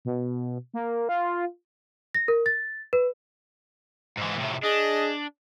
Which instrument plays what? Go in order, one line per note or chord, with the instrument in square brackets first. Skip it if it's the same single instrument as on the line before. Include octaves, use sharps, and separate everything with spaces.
[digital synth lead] B2
A#3
F4
[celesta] A#6
A#4
A6
B4
[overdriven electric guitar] G#2 E3
A2 C3
[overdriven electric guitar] D4 [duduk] G#4 [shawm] D#5